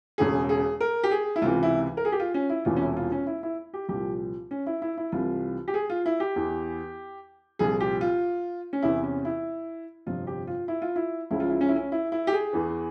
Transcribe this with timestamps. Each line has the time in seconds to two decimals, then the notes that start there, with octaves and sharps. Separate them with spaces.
0.18 E1 E2 C#3 E3 G#4
0.49 G#4
0.81 A#4
1.04 G4
1.11 G#4
1.36 E4
1.41 C#2 C3 E3 F4
1.63 E4
1.97 A#4
2.05 G#4
2.12 G4
2.20 F4
2.34 C#4
2.50 E4
2.65 E1 E2 C3 E3 F4
2.77 C#4
2.81 E4
2.97 F4
3.12 C#4
3.27 E4
3.43 E4
3.74 G4
3.88 C2 A#2 F3 G4
4.51 C#4
4.67 E4
4.82 E4
4.98 E4
5.12 C2 C3 E3 F4
5.68 G4
5.74 G#4
5.90 F4
6.06 E4
6.20 G4
6.36 E2 E3
7.59 C2 A#2 F3 G#4
7.80 G4
8.01 F4
8.73 C#4
8.82 E2 C3 E3 E4
9.03 C#4
9.25 E4
10.06 G1 F2 C3 F3 F4
10.27 G4
10.47 F4
10.68 E4
10.82 F4
10.96 E4
11.31 C#2 C#3 F3 E4
11.40 F4
11.50 E4
11.61 C#4
11.68 E4
11.76 C#4
11.92 E4
12.12 E4
12.27 G4
12.33 G#4
12.53 E2 E3